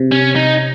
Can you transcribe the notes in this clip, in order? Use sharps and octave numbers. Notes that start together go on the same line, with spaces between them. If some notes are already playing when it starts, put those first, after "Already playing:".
Already playing: C3
C#4
D#4